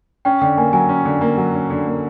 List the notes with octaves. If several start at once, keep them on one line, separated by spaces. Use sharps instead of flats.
C#4 G5
D3 G5
A#3 G#5
F#3 G#5
C#4
D3
A#3
F#3
C#4
D3
A#3